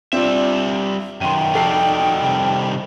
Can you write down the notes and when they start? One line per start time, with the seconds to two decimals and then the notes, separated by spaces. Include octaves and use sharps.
0.13 G3 C4 D4 F4 E5
1.21 F#2 C3 D#3 G5 C6 D#7
1.54 F1 D#4 F#4 A4 D5 C7
2.23 C3 D#3 G3